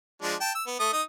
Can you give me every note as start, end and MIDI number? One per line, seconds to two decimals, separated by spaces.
0.22 0.35 53
0.22 0.35 56
0.22 0.35 62
0.41 0.52 79
0.41 0.52 81
0.55 0.64 88
0.67 0.78 59
0.80 0.90 57
0.80 0.90 87
0.93 1.02 63
0.93 1.02 87